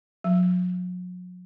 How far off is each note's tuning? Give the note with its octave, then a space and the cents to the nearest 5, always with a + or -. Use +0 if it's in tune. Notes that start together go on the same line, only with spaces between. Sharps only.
F#3 -40